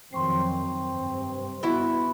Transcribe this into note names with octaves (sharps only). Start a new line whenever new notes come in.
F2 D#3 F#3 C4 C6 C#6 C7
G2 C3
B3 E4 F#4